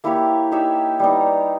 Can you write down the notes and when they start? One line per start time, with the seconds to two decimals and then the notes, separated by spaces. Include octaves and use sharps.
0.04 A#3 E4 G4 C#5
0.52 D#4 G4 C#5 E5
1.00 G3 B3 D#4